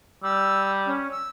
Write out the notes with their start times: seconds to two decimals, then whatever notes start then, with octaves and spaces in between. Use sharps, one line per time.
0.23 G3 E6
0.87 C#4
1.11 E6